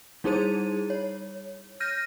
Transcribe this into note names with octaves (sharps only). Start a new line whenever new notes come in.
G3 D#4 E4 G#4 C5 D#7
C#5
F6 G6 A#6 D#7